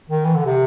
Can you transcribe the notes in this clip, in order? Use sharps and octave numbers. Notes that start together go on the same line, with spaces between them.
D#3
E3
D3
C3